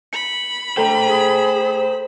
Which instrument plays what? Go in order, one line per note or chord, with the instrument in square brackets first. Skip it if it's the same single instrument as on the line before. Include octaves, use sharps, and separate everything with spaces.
[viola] B5 [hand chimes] C#7
[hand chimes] A3 A4 G5 [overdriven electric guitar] C5 A#5
[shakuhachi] G#4